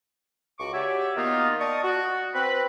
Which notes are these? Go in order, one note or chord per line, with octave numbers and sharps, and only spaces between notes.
C#2 F#4 C#6 D6
F#4 G4 C#5 D5 E5 G#5
D#3 A#3 B3 D#4 F4
D5 D#5 A5 C#6 D#6
F#4
C4 B4